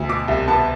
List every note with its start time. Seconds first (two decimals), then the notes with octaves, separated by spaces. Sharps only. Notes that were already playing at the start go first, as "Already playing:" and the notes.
Already playing: D2
0.09 B2 D6
0.28 C2
0.48 B3 A5